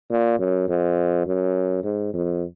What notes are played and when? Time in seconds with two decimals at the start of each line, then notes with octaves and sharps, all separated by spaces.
0.11 A#2
0.39 F#2
0.69 F2
1.26 F#2
1.84 G#2
2.13 F2